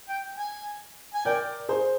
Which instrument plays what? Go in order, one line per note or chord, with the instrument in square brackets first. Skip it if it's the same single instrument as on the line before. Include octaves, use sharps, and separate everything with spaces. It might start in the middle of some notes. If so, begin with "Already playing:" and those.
[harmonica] G5
G#5
G#5
[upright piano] A#4 D5 [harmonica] G5
[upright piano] G#4 C5